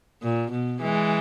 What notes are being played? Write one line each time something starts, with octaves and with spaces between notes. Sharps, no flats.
A#2
B2
E3 G#3